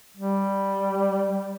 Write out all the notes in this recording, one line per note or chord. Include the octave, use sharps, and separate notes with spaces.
G3